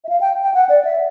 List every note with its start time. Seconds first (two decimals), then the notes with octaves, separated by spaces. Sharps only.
0.04 E5
0.09 F5
0.21 G5
0.43 G5
0.54 F#5
0.69 D5
0.85 E5